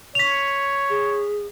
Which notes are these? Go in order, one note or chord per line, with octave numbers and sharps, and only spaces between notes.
C#5 B6 F7
G#4